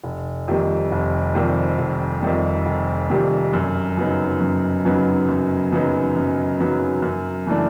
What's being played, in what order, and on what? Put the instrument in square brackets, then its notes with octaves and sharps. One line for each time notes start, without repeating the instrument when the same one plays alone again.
[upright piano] F1
F2 C3 D#3 G3
F1
F2 C3 D#3 G3
F1
F2 C3 D#3 G3
F1
F2 C3 D#3 G3
F#2
C#3 F#3 B3 D#4
F#2
C#3 F#3 B3 D#4
F#2
C#3 F#3 B3 D#4
F#2
C#3 F#3 B3 D#4
F#2
C#3 E3 A3 D4